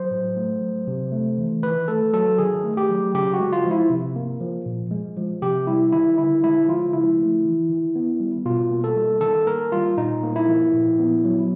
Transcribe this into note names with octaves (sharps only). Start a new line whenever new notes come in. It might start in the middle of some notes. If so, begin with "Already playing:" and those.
Already playing: F#3 C5
A2
A3
F#3
C3
A3
E3
D#3 B4
A3 A4
F#3 A4
D#3 G#4
A3
G4
F#3
C#3 G4
F#4
G#3
F4
F3
E4
C3
A#3
F3
A#2
G#3
F3
C3 G4
G3 E4
D#3 E4
D3 E4
G#3 E4
F3 F4
C#3 E4
A3
E3
D#3
B3
G3
B2 F4
A#3
A4
G3
D#3 A4
A#3 A#4
G3 F4
A#2 D#4
A#3
E4
F3
A#2
B3
F#3